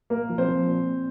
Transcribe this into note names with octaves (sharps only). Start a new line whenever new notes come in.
A#2 A#3 A#4
F3
C4 C5
F3
A#2
A#2